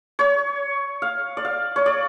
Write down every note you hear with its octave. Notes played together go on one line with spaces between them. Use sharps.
C#5
F5
D5
F5
C#5
D5